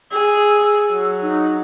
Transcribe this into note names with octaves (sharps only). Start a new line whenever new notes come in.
G#4 E6
F#3
D#4